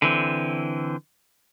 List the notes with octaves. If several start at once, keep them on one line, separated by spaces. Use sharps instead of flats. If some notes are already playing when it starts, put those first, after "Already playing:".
D3 E3 C4